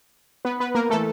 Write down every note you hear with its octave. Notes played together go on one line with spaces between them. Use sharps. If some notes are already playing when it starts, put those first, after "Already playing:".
B3 B4
B3 B4
A#3 A#4
E3 A3 A4